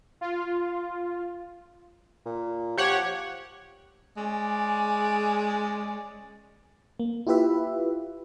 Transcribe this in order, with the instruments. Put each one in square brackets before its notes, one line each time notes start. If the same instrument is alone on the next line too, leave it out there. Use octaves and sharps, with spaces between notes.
[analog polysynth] F4
[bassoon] A#2
[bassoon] F3 [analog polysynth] G4 C#5 F#5
[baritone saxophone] G#3 [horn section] C#4 D5
[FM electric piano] A#3
E4 F4 G4 B4 E5